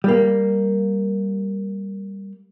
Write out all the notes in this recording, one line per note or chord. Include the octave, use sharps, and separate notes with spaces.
G3 A#3